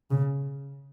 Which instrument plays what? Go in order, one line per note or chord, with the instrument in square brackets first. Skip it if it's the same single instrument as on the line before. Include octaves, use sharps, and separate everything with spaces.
[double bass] C#3